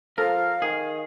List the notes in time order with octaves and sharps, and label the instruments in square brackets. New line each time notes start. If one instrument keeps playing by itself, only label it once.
[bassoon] F3 [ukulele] A4 [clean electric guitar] A#4 [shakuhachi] F5
[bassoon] D#3 [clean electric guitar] G#4